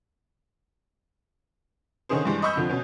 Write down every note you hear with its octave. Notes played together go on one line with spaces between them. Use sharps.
D3 D#3 C#4 D#4 G#4 C5
G2 E3 G3 G#3
D#5 B5 C#6 E6 G6
F2 D3 F3
B2 C#4